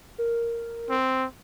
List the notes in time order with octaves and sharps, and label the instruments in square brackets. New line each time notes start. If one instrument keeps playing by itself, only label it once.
[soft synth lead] A#4
[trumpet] C4